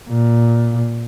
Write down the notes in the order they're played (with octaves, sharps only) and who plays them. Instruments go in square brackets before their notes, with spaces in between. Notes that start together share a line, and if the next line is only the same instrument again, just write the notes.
[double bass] A#2